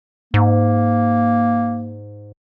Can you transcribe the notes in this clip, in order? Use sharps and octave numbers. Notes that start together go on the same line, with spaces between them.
G#2 A#3